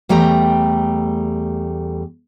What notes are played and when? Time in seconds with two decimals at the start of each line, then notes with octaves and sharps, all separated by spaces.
0.09 E2 G3 A3 G5 A#5